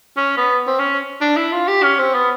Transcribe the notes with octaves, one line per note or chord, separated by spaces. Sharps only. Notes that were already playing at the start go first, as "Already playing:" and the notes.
C#4
B3
C4
C#4
D4
E4
F4
G4
C#4
C4
B3